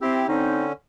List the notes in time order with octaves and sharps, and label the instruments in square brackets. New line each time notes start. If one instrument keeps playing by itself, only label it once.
[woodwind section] C4 [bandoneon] E4 G4
[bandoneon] D3 C#4 [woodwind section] C4 D#4